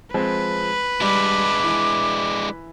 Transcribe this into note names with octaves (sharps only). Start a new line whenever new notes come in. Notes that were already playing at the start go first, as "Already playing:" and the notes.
F3 G#3 C4 B4
G3 G#3 D4 D6
E3 E4